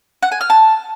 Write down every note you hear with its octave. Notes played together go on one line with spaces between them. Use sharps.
F#5
G#5
F6
A5